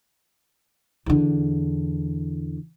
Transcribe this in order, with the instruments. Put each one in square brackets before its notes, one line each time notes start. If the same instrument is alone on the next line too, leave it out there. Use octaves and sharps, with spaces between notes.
[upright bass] E2 D3